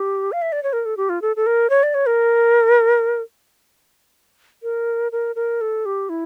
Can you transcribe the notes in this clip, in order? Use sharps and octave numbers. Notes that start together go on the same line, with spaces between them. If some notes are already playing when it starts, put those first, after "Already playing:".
Already playing: G4
F5
E5
D5
C#5
A#4
A4
G4
F4
A4
A4
A#4
C#5
D5
C#5
A#4
A#4
A#4
A#4
A4
G4
E4